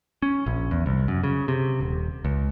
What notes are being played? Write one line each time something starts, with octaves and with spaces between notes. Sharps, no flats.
C#4
A#1
E2
C2
F#2
C#3
C3
D#1
C#2